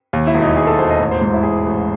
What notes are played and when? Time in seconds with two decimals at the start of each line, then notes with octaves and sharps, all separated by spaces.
0.13 D#2
0.27 E4
0.34 E1
0.42 D#4
0.57 E1 G#4
0.67 A4
0.79 E1 C5
0.90 D#5
0.99 A1
1.11 C5
1.21 G#2
1.33 E4
1.43 A1 G#4
1.66 A1